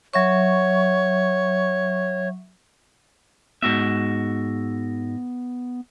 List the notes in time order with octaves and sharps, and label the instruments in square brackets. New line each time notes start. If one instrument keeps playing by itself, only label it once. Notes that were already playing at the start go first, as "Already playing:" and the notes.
[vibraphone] F#3 E5 C#6 [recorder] C#5
[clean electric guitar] G#2 F#4 E5 [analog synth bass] B3